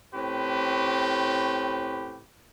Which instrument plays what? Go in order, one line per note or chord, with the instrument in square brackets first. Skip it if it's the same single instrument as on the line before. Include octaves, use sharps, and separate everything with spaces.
[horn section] A2 C4 C#4 G4 B4